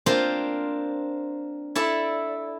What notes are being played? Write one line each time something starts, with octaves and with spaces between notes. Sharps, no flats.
A#3 C4 D4 F4 C5 F5
E4 A4 D5